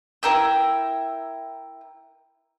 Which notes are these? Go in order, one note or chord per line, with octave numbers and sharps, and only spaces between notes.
E4 A#4 G5 E6